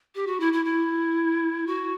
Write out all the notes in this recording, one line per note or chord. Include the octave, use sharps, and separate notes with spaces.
G4
F#4
E4
E4
E4
F#4